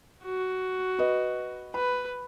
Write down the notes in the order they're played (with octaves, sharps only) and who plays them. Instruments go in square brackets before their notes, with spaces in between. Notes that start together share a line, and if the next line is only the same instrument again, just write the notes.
[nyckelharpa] F#4
[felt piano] B4 D#5
[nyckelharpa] B4 [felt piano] B5